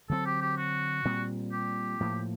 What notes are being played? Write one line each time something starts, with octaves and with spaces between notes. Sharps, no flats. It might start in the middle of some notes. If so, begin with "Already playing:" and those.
D3 F#3 A3 C4 A4
G4
G4
F#4
A#2 G3 C4
G4
A2 F3 A#3